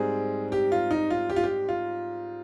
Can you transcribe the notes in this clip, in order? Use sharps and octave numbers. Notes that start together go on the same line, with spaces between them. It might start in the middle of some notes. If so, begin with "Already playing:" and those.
Already playing: G#2 G3 C4 G#4
G4
F4
D#4
F4
G4
F4
G4
F4